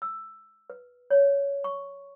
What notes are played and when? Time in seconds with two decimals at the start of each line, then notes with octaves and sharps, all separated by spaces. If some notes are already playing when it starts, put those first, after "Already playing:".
0.02 E6
0.70 B4
1.10 C#5
1.64 C#6